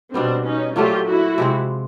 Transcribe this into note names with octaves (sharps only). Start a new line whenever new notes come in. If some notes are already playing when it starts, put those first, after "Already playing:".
B2 G3 B3 C4 D4
C#4 D#4
A#2 F#3 A3 D4 F4 G4
E4 F#4
C3 F3 G#3 C4